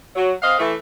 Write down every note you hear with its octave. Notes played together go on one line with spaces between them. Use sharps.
F#3
C4 D#5 F5
E3 A3